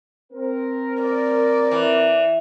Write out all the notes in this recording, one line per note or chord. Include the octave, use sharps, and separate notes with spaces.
C4 A#4
D5
E3